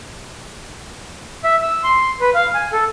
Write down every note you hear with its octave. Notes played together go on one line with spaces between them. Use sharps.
E5
E6
C6
B4
F5
G#5
A4